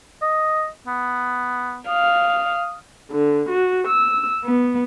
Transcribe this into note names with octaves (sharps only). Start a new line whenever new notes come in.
D#5
B3
F5 D#6
D3
F#4
E6
B3